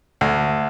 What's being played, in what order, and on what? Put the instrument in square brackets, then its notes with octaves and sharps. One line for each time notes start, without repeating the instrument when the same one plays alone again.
[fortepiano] D2